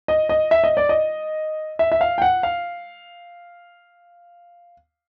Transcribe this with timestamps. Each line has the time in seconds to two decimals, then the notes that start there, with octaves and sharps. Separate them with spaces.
0.08 D#5
0.29 D#5
0.51 E5
0.64 D#5
0.77 D5
0.89 D#5
1.79 E5
1.92 E5
2.01 F5
2.18 G5
2.22 F#5
2.43 F5